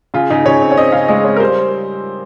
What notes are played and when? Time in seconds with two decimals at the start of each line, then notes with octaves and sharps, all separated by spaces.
0.14 C#3 F4
0.30 C#3 D#4
0.46 C#3 C#5
0.61 C4
0.72 C#5
0.77 C4 D#5
0.92 C#3 F5
1.08 G#3 D#5
1.25 C4 C#5
1.36 A#4
1.40 G3 C5